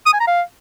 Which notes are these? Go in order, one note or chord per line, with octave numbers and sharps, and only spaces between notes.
D#6
G#5
A#5
F5